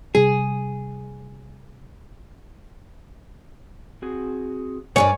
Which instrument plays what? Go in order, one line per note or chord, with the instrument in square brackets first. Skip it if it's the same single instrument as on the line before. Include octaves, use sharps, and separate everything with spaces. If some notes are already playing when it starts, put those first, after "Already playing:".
[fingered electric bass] C3 G3 [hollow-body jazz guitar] G#4
[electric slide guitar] C4 F#4 G#4
[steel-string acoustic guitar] G2 G#4 D5 [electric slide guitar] G3 A#4 [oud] C#5 [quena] G#5